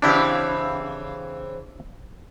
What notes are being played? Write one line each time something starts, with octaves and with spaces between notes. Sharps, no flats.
C#3 E3 C4 D4 E4 G4